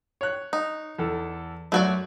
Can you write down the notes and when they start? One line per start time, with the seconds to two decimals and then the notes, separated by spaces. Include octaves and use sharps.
0.21 C#5 F#6
0.53 D#4
0.98 E2 A4
1.72 F#2 F#3 A3 F#4 D5